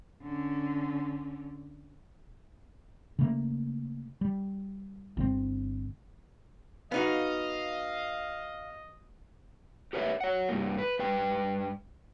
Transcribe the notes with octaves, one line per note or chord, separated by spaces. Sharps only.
D3 C#4
C#3 A3 A#3
G3
G1 C3 C4
B3 D#4 F#4 D#5 F5
G4 A#4 B4 C#5 E5
C#5 F#5
G2 A#3
B4
G2 B4 G5